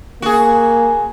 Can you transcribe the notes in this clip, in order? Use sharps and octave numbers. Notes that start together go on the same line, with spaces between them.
A#3 F#4 G#4